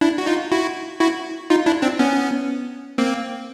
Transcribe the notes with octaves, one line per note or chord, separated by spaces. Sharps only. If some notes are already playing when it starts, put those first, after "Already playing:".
D4 E4
F#4
D#4 F4
E4 F#4
E4 F#4
D#4 F4
D4 E4
C4 D4
B3 C#4
A#3 C4